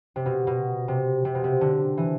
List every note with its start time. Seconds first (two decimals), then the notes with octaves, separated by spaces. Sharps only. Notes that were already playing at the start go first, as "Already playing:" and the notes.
0.16 C3
0.26 B2
0.47 B2
0.88 C3
1.25 C3
1.35 B2
1.44 C3
1.61 D3
1.97 E3